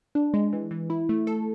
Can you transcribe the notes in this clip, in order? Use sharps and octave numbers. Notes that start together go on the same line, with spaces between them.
D4
G#3
E3
E3
E4
A3
A4